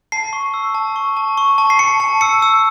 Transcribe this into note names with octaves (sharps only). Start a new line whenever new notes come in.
A5 C7
C#6
E6
A5
C#6
A5
C#6
A5
C7
A5 C#7
A5
E6 C#7
E6